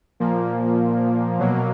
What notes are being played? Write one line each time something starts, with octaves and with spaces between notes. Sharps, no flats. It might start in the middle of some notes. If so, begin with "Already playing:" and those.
A#2 F3 A#3
B2 F#3 A#3